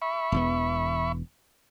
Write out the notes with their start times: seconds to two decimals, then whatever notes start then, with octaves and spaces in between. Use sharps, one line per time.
0.02 E5 B5 C#6
0.32 E1 E2 B3